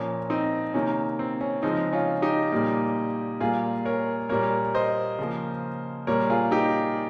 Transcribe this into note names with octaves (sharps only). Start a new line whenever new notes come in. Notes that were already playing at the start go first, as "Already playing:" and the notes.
Already playing: A#2 F3 A#3 C#4
C4 D#4
C3 D#3 A#3 C#4
C4
C#4
C#3 F3 G#3 C4 D#4
C#4 F4
D#4 G4
A#2 G3 A#3
A#2 G3 A#3 F4 G#4
A#4 C#5
A#2 G3 A#3 A#4 C#5
C5 D#5
C#3 F3 A#3
A#2 G3 A#3 A#4 C#5
F4 G#4
D#4 G4